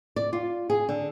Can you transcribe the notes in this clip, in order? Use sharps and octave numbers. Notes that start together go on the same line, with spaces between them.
D5
F4
G#4
D3